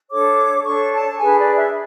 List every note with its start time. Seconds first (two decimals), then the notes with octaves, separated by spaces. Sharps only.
0.09 D4 A4 C#5 D6
0.64 D4 A4 C#5 C#6
0.92 A5
1.19 D4 G#4 B4 G#5
1.38 D5
1.56 E5